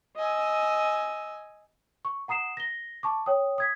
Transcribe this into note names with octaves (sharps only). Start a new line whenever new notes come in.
D#5 G#5 E6
C#6
F#5 A#5 D#6 C7 E7
A#6 G7
A5 C#6 D6
C#5 G5 D#6
D#6 G#6 B6